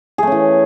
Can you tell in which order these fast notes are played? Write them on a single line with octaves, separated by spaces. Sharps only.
G#4 A3 C#4 E3